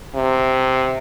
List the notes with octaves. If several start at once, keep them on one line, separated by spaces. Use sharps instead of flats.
C3